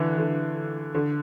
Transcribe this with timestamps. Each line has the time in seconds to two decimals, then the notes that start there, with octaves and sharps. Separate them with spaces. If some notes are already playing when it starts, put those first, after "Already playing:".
Already playing: D3 E3
0.18 D3
0.94 D3